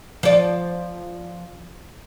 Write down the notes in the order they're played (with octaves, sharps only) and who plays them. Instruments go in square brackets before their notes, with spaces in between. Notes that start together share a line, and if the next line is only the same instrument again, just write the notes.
[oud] F3 D5